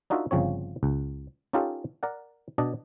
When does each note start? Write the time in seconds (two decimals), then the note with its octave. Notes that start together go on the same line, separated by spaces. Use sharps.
0.10 D4 D#4 F4 F#4 A#4 E5
0.31 G1 C#3 F3 C4 C#5
0.83 C#2
1.53 C#4 D#4 F4 G4 A4 A#4
2.03 A#4 D5 F#5
2.58 B2 D4 D5 D#5 A5